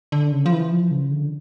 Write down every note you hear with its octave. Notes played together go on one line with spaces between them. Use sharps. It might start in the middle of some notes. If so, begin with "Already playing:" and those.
D3
C#3
F3
E3
F3
C#3
D3